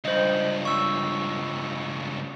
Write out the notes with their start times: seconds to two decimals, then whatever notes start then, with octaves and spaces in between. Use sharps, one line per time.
0.05 C#2 G2 C5 D#5
0.65 C#6 E6